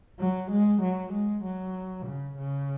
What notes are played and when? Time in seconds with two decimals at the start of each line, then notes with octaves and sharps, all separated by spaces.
0.19 F#3
0.51 G#3
0.82 F#3
1.13 G#3
1.44 F#3
2.06 C#3
2.38 C#3